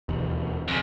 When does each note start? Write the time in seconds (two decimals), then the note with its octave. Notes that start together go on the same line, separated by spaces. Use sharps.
0.09 E1 D#2
0.68 F2 C#3